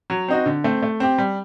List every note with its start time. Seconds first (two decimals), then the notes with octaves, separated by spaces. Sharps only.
0.10 F#3
0.28 C4 D#4 F#4
0.46 D3
0.64 A3 C4
0.83 A3
1.00 C4 G4
1.18 G3